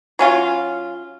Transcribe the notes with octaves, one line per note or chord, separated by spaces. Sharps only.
F#3 C#4 F4